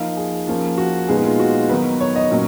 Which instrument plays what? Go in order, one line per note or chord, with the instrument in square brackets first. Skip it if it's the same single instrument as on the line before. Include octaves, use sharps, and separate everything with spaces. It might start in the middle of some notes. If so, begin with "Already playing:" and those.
Already playing: [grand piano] F3 A#3 D#4 F5
G#4
F3 A#3 C#4
F#4
A#2 G#3 B3 D#4 G#4
F4
F#4
D#3 F#3 B3 D#4 B4
C#5
D#5
A#2 F#3 C#4